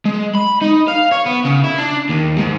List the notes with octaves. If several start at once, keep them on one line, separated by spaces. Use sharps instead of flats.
G#3
B5
D#4
F5
C#5
B3
C#3
E4
D4
D#2
G#2